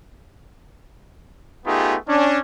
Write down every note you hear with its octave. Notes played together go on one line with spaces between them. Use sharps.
A3 B3 D#4 F4 G4 G#4
C#4 D4